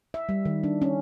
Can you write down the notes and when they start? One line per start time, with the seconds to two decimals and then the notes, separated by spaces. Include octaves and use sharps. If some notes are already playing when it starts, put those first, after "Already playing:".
0.14 E5
0.29 G3
0.45 D#3
0.64 D4
0.82 C#4